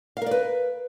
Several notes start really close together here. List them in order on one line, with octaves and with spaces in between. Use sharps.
F5 A#4 D5 B4